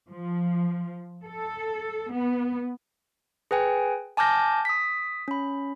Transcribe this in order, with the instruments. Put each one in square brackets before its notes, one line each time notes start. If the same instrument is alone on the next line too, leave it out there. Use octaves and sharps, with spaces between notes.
[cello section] F3
A4
B3
[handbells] G#4 B4 G5 G#5
G#5 A5 D6 F6 G6 A#6
D#6 B6
C#4 B5